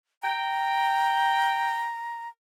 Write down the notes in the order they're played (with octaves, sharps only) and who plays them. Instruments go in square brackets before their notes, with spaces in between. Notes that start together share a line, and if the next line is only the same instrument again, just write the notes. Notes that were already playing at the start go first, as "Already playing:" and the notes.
[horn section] G5 [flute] A#5